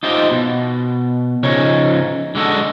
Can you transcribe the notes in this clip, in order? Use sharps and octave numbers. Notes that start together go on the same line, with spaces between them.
D#4 F4 G4 C5 D#5
B2
C#3 F3 C#4 D#4 C#5
D3 G#3 F#4 A4 D#5